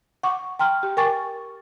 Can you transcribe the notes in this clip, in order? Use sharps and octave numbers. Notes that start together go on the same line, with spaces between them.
F#5 C#6 D6
G5 A#5 C6 F6
G4 G5
A#4 G5 G#5 C#6 D6 A6